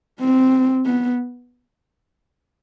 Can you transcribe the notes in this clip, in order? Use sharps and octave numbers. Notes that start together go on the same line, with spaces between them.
C4
B3